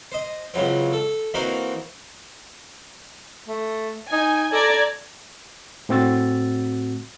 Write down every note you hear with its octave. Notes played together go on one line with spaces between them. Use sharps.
C5 D#5
C#2 C#3 E3 F#3 C4
A4
E3 A#3 C4 D#4 F#4 C5
A3
D#4 G#5
A4 D5 A#5 G#6
A2 A3 C4 F#4 E6 A6